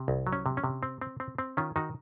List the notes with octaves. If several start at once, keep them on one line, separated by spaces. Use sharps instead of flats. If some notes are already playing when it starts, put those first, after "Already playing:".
Already playing: C3
C2
F#3
C#4
C3
C#4
C3
C4
C4
C4
C4
D#3 C#4 F4
D#3 D#4 F#4